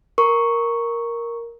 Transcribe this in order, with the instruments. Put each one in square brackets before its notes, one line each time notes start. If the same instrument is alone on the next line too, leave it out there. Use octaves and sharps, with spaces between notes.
[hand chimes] A#4 C#6